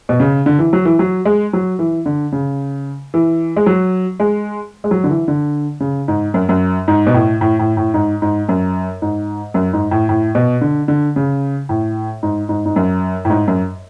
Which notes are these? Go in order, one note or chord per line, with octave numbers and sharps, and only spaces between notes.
B2
C#3
D3
E3
F#3
E3
F#3
G#3
F#3
E3
D3
C#3
E3
G#3
F#3
G#3
G#3
F#3
D3
E3
D3
C#3
G#2
F#2
F#2
G#2
B2
A2
A2
A2
A2
G#2
G#2
F#2
G#2
F#2
G#2
A2
A2
B2
D3
D3
C#3
A2
G#2
G#2
G#2
F#2
A2
G#2
F#2